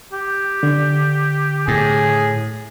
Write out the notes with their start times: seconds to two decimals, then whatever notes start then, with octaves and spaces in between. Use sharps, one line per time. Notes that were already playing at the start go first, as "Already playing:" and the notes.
0.12 G4
0.63 D3
1.68 A2 G#4